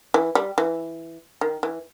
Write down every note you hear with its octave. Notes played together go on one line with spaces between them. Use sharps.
E3
G3
E3
D#3
E3